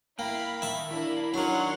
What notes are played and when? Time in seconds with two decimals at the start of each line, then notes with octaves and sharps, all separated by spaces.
0.19 A#3 E4 F5 G5 B5
0.62 D#3 E5 A5
0.91 A#3 D4 E4 B5
1.34 D#3 F#3 D4 C#5 F#5 C6